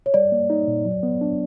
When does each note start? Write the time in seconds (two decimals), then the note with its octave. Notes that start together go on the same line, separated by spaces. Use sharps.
0.06 C#5
0.14 G3 D5
0.32 A#3
0.50 D#4
0.67 A#2
0.85 F#3
1.03 B3
1.21 D4